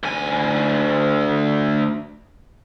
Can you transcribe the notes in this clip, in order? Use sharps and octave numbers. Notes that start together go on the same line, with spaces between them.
D2 G#5